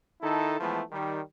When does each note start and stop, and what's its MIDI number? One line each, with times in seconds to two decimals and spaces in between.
0.22 0.56 51
0.22 0.56 63
0.22 0.56 64
0.22 0.56 69
0.60 0.81 52
0.60 0.81 53
0.60 0.81 56
0.60 0.81 57
0.60 0.81 59
0.91 1.19 51
0.91 1.19 55